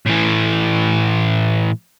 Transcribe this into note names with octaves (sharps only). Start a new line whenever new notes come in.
A2 E3